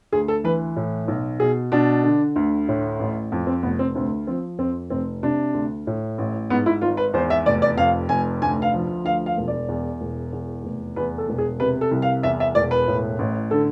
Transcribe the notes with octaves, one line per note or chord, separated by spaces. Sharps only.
D2 G#4
A4
E3 B4
A2
B1
B2 G#4
B2 D4
D3
D2
A2
A1
F2
C4
F1 B3
C4
D2 C4
F3 C4
F2 C4
F1 C4
C3 D4
D2
A2
A1
G#2 B3
E4
G#1 F4
B4
E2 C5
E5
F1 D5
D5
F2 F5
F1 G#5
D2 G#5
F5
F3
D2 F5
F5
E1
D5
E2
E1
E2
F1
E2 B4
A4
E1
G#4
C3 B4
A4
C2
F5
E2 E5
E5
E1 D5
B4
A2
A1
D3 A4